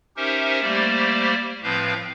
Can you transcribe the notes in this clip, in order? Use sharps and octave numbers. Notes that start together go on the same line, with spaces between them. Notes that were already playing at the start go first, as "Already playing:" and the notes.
C#4 D#4 G4 A#4 C5 E5
G3 A3 A#3 G4 C5 D5
A2 F3 C4 B4 F5 G6